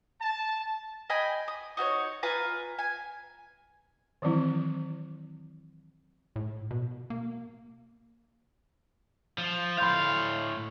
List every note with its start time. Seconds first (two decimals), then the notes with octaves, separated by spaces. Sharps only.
0.20 A5
1.10 D#5 G5 G#5 B5
1.48 D#6
1.77 D#4 F#4 C5 C#5
2.23 F4 B4 G#5 A#5
2.79 G#5
4.22 D#3 E3 F#3 C4 E4
6.36 A2
6.71 B2
7.10 A#3
9.38 F3
9.78 A2 F5 B5 C6 G6